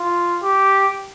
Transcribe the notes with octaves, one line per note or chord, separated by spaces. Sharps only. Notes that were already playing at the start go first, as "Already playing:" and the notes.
Already playing: F4
G4